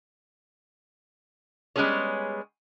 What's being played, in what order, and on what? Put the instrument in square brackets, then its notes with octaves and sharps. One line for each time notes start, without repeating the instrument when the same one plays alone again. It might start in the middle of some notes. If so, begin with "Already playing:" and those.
[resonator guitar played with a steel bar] G3 G#3 B3 C#4 G#4 C#5